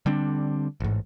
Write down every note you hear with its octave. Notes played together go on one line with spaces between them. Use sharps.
D3 G3 C4 D4
A1 G#2